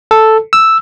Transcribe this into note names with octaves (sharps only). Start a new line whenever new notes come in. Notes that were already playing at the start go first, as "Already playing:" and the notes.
A4
E6